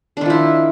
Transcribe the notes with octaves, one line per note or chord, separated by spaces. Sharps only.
D#3 F3 D4 E4